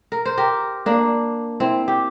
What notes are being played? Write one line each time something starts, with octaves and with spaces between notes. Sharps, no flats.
A#4
C5
G4 A#4
A#3 D4
C4 E4
G4